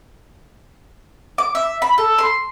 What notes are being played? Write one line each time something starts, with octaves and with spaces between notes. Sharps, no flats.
D6
E5
B5
A4
C6